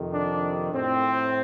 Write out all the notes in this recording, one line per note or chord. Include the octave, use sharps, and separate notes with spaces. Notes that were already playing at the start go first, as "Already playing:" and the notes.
Already playing: F2 C3 D#3
D4
A2 C4